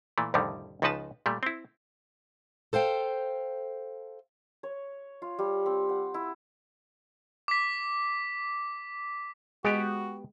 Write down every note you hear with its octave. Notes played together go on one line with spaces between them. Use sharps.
A#2 E3 A3
C2 F2 A2 D3 D#3 G3
C#2 C#3 F3 D#4 B4 A5
A#2 G3 A3
C4 E4
A4 C5 F5 G5
C#5
F4
G3
C4
F#5
E4
D6 B6
G#3 B3 F#4 G4